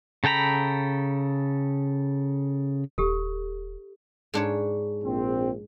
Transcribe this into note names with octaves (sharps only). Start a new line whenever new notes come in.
C#3 A4 G5 A#5 B5
D#1 G4 A4
G#2 D4 C#5
A#1 C4